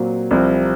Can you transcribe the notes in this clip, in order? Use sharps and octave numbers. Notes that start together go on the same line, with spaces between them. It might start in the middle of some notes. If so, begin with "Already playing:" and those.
Already playing: A#2 F#3 C4
C2 C3 F3 C4